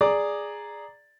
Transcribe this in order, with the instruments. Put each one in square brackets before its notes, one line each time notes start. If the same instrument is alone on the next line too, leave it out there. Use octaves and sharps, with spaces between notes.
[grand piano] G#4 D5 A#5 D6